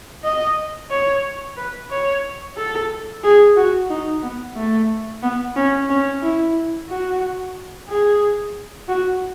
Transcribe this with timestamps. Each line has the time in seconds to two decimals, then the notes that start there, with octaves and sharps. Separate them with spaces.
0.24 D#5
0.90 C#5
1.57 B4
1.90 C#5
2.57 A4
3.23 G#4
3.56 F#4
3.90 D#4
4.23 B3
4.56 A3
5.22 B3
5.56 C#4
5.89 C#4
6.22 E4
6.89 F#4
7.89 G#4
8.88 F#4